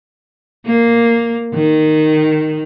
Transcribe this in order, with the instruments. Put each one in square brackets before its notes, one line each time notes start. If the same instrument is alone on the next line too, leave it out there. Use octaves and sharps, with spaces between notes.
[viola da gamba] A#3
D#3